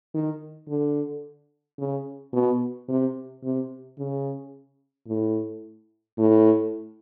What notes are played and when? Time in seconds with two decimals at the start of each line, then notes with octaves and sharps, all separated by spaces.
0.14 D#3
0.68 D3
1.79 C#3
2.33 B2
2.89 C3
3.43 C3
3.99 C#3
5.08 A2
6.18 A2